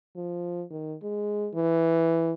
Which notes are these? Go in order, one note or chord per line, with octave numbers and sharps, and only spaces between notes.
F3
D#3
G#3
E3